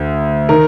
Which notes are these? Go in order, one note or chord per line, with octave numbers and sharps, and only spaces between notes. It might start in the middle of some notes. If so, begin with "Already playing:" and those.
Already playing: D2
D#3 A#4